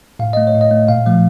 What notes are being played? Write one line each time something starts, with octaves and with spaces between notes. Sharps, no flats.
A2 F5
A3 D#5
C#5
A2
D#5
A3
A#2 F5
F3 A3